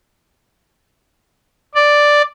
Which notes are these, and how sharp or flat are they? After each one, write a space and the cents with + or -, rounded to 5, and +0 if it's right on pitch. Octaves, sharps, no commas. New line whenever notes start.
D5 +0